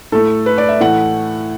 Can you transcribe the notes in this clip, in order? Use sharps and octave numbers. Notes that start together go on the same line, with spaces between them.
A2 A3 A4
B4
D5
E5
A2 E3 A3 F#5